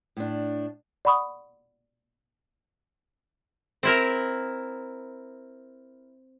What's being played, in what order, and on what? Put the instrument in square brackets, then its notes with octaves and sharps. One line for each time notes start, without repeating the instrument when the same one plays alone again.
[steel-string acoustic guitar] A2 D4
[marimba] D5 F#5 B5 C#6 D#6
[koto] C4 E4 A#4